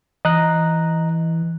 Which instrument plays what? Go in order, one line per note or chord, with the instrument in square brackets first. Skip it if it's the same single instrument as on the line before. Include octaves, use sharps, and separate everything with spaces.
[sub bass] E3 [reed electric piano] D#5 A#5 F#6